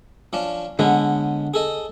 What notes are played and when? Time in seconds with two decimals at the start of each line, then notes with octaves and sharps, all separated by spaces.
0.33 F3 C#4 D4
0.79 D3 G#3 B3 C#4
1.54 G#4 A4 D#5